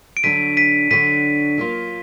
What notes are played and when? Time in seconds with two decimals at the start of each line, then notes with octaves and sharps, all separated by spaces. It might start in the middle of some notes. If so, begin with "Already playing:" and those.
0.17 D7
0.23 D3 F#3 D4 F#4 B6 D#7
0.57 B6 D#7
0.91 D3 F#3 D4 F#4 B6 D#7
1.58 F#3 A#3 F4